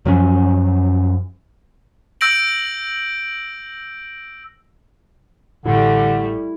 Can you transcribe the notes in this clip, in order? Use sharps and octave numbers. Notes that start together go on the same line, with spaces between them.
F#2 F3 F#3 C#4
E6 G6 A#6 D7 F#7
A1 D3 G3 A3 E4